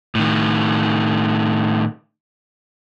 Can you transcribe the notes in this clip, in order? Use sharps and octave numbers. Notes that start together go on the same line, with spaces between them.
A2 D#3